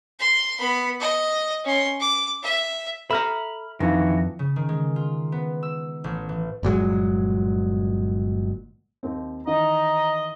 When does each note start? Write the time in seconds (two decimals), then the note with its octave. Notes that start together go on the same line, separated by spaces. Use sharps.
0.20 C6
0.59 B3 B5
1.01 D#5
1.64 C#4 C6
2.01 D6
2.43 E5
3.11 A4 E5 A#5 B5 F6
3.80 F2 D#3 E3 D4 D#4 F#4 F5
4.39 C#3
4.56 D#3
4.69 G#3
4.96 F4
5.32 B3
5.63 E6
6.04 A1
6.29 E3
6.63 G1 A#2 F#3 G#3
9.03 D#2 C4
9.47 D#3 E3 D#4 D#5 A#5